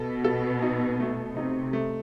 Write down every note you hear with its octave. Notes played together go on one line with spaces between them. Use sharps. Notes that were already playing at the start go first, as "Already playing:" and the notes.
Already playing: B2 A4
A4
D#4
A3
C3 D#4
A3